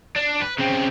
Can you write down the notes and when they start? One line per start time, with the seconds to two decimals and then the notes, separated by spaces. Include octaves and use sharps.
0.16 D4
0.42 B4
0.59 C#3 C4